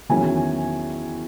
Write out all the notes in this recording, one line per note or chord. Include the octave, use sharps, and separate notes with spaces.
E2 D#3 F#3 C#4 E4 G#5